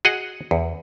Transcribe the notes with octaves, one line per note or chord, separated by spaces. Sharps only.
F#4 G#4 D#5 F#5
E2